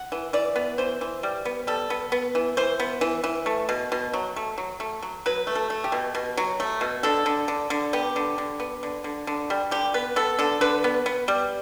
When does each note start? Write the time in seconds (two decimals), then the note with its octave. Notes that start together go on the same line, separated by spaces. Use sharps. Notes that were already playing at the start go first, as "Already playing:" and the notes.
Already playing: F#5
0.12 E3
0.33 E3 D5
0.56 B3
0.78 E3 C5
1.01 E3
1.23 G3
1.45 B3
1.67 G3 A4
1.90 B3
2.12 B3
2.35 E3
2.57 E3 C5
2.80 B3
3.01 E3
3.24 E3
3.46 A3
3.69 B2
3.92 B2
4.14 F#3
4.36 A3
4.58 F#3
4.80 A3
5.03 F#3
5.26 F#3 B4
5.47 A3
5.55 A4
5.70 A3
5.84 G4
5.92 B2
6.15 B2
6.37 F#3
6.60 A3
6.81 B2
7.03 D3 A4
7.26 D3
7.48 D3
7.70 D3
7.93 B3 G4
8.16 D3
8.38 D3
8.60 B3
8.83 D3
9.04 D3
9.27 D3
9.50 G3
9.71 D3 G4
9.94 B3 B4
10.16 B3 A4
10.39 D3 A4
10.61 D3 B4
10.84 B3
11.06 B3
11.28 G3